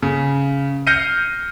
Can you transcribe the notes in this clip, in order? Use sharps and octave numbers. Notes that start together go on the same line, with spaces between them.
C#3
F6 G6 A#6 C7 C#7 D#7